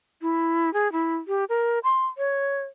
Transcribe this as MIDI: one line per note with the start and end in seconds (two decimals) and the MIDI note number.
0.22 0.72 64
0.73 0.91 68
0.92 1.16 64
1.28 1.44 67
1.49 1.79 70
1.84 2.06 84
2.18 2.61 73